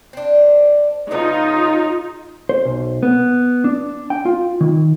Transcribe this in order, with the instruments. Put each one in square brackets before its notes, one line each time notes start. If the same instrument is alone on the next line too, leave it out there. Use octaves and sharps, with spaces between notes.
[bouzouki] C4 D4
[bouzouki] C#3 B3 C#4 [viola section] D#4 F4
[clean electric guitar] C5
B1
B3
D4
G5
F4
D#3